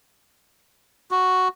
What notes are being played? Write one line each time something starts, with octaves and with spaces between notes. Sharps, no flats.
F#4